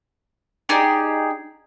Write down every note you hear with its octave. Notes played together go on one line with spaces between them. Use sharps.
D#4 G4 G#4 D5